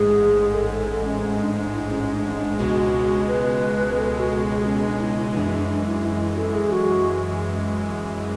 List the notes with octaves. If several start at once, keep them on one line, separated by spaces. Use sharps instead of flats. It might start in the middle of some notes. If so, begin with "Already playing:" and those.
Already playing: A1 G#2 G#3 G#4
A4
A4
A4
C#4
C#4
D4
D4
E4
C#4
D4
D4
C#2 B2 G#3 F#4
B4
A4
F#4
G#4
C#4
D4
E4
E4
F#2 E3 G#3 D4
D4
D4
E4
E4
E4
A4
G#4
F#4